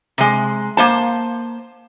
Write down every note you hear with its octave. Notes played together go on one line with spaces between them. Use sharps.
C3 G#3
A#3 C5 A5